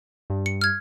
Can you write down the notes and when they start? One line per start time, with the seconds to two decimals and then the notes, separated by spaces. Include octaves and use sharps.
0.30 G2
0.46 C#7
0.61 F6 G#6